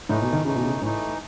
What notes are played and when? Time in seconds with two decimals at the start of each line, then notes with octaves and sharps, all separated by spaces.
0.09 A2 E3 A3 D#4
0.22 B2
0.33 D#3
0.45 C#3 E3 A3 D#4
0.56 B2
0.64 C#3
0.82 A2 E3 A3 D#4